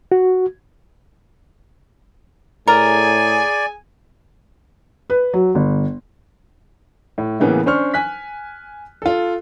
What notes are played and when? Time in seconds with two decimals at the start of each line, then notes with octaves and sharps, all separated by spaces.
0.12 F#4
2.68 A2 G#4 A#4 D5 G#5
5.10 B4
5.34 F#3
5.55 G1
7.18 A2
7.40 A2 C#3 E3 A#3 B3 C#4
7.66 C#4 D4 C5 C#6 F6
7.94 G#5 F#6 B6
9.02 F4 A4